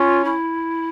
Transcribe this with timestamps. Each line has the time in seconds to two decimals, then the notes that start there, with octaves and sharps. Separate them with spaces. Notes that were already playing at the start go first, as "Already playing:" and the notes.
Already playing: C#4 F4
0.25 E4